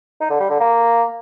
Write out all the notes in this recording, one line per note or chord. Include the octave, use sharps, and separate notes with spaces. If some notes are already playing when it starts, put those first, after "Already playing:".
D#4
D3
G3
D3
A#3